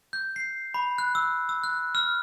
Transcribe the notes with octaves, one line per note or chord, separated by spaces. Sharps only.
G6
C7
B5
F#6
E6
E6
F#6
F6